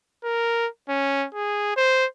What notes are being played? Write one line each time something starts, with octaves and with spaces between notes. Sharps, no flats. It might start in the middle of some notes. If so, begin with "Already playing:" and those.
A#4
C#4
G#4
C5